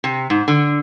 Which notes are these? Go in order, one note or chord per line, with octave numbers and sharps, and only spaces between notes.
C3
G#2
D3